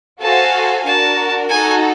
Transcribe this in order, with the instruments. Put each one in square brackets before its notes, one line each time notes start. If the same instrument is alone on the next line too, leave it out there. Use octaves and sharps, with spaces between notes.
[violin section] F#4 A4 C5 F5 G#5 [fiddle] A5
[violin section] D4 F#4 A#4 [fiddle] A5
[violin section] D#4 F#4 A4 [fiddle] G#5